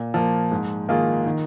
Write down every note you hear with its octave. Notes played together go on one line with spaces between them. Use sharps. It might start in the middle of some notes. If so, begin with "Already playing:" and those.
Already playing: A#2
F3 A#3
G#2
D#3 A#3 F4 G#4
D#3